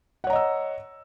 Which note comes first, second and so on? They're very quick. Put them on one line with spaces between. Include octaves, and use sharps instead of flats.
F#5 C#5 A#5 D#5 E6